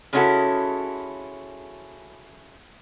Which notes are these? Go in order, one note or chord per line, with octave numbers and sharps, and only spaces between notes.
C#3 G#3 C#4 E4 F#4 A4